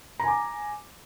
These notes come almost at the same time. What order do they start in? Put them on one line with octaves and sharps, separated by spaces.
A#5 G#5 D6